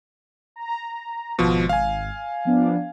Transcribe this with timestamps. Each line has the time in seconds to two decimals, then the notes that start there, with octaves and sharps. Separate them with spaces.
0.56 A#5
1.39 G#1 B2 F3
1.69 F5 G#5
2.45 F3 B3 D4